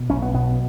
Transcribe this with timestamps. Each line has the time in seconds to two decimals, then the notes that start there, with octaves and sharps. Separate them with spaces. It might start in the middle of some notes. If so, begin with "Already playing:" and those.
Already playing: B2
0.10 B1 C#4
0.22 B3
0.34 B2 B3